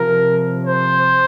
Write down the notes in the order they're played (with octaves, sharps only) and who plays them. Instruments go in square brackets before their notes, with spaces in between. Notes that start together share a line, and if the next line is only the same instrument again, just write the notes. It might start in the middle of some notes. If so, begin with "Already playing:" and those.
Already playing: [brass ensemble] C3 F3 A#4
C5